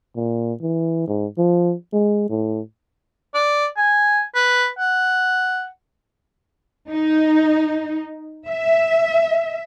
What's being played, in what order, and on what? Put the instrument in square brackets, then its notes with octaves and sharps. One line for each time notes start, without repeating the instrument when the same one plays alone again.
[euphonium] A#2
E3
G#2
F3
G#3
A2
[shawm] D5
G#5
B4
F#5
[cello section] D#4
E5